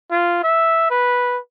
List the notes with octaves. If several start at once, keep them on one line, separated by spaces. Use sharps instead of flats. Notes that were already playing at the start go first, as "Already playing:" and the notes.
F4
E5
B4